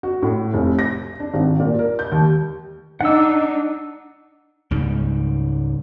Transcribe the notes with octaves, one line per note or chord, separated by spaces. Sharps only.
F#4
A2
F1
A#6
D4
G#1
A#2
A#4
G6
D#2
D4 D#4 F#5 E6
C#2 G#2 G3